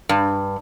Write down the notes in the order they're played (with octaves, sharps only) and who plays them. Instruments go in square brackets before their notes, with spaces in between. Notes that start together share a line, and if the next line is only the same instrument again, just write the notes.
[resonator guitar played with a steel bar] G2